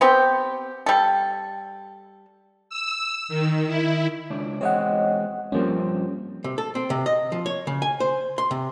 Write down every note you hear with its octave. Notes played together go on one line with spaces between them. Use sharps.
B3 C4 G4
G3 A4
E6
D#3
E4
C#2 D4
E2 G#3 C4 C#5 D#5 F#5
G2 F3 G3 A#3 C4 C#4
C3
A4
C4
C3
D#5
F3
C#5
C#3
G#5
C5
C6
C3